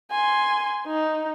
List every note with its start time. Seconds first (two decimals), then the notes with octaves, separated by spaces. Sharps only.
0.11 G#5 C6
0.87 D#4